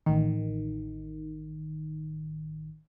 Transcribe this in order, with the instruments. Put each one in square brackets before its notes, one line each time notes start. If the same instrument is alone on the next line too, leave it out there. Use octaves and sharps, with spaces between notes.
[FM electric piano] A1 D#3